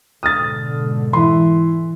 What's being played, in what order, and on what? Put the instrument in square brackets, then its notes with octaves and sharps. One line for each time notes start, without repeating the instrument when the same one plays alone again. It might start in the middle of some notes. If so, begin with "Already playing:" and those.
[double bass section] G#2 B2 D3 [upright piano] D#6 F6 A6
[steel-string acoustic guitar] E3 [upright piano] E4 C6